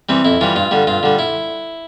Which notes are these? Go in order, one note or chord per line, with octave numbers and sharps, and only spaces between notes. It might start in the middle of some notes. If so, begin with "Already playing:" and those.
E3 G3 C4
F2 E4
E3 G3 F4
G2 F4
D3 G3
G2 F4
D3 G3
E4